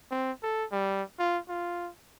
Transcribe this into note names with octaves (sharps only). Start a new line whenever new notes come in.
C4
A4
G3
F4
F4